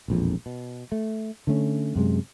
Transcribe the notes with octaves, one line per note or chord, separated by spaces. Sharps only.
E1 A#1 F2
B2
A3
D3 A3 C#4
F#2 C3 G#3